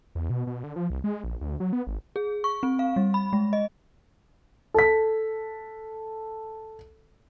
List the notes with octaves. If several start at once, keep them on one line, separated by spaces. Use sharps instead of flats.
E2
B2
B2
D3
F3
C2
G#3
A#1
D2
F#3
B3
G#1
G#4
C#6
C4
F5
G3
B5
G#3
D#5
A4 B6